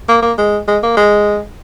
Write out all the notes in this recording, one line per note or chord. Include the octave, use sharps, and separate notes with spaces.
A#3
A#3
G#3
G#3
A#3
G#3